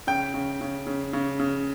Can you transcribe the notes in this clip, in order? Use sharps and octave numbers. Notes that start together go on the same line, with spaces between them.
C#3 G5
C#3
C#3
C#3
C#3
C#3